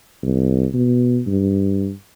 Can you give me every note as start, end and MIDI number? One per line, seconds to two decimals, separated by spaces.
0.23 0.66 36
0.74 1.20 47
1.27 1.91 43